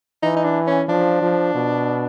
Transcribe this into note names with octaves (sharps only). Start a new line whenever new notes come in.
E3 D#4
D#4
D4
C#4
F3 D4
F3
B2